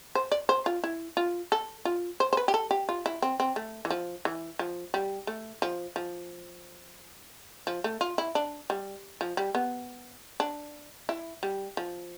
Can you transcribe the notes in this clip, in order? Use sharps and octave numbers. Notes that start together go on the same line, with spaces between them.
C5
D5
C5
F4
E4
F4
A4
F4
C5
C5
B4
G4
A4
G4
F4
E4
C4
C4
A3
E3
F3
E3
F3
G3
A3
F3
F3
F3
A3
F4
E4
D4
G3
F3
G3
B3
D4
E4
G3
F3